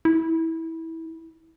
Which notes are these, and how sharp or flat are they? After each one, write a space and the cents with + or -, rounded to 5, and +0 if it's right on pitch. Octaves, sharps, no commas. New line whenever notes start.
E4 -20